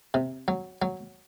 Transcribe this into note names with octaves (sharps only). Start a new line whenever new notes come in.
C3
F#3
F#3